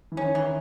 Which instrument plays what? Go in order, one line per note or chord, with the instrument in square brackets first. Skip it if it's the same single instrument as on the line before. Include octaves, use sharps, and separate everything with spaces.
[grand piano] E3
[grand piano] D#3 [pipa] C#4
[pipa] E3
[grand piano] D#3